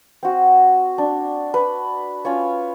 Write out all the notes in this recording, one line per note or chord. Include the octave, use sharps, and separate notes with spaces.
C4 F#4
D4
B4
C#4 F4 C#5